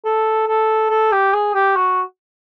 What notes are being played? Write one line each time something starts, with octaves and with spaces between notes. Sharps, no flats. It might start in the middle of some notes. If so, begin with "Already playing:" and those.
A4
A4
A4
G4
G#4
G4
F#4